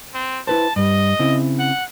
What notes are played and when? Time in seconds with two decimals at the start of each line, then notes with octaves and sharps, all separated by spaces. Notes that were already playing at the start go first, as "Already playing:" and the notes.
0.14 C4
0.47 E4 B4 C5 A5
0.76 G2 G3 D#5
1.19 C#3 C4 E4
1.59 F#5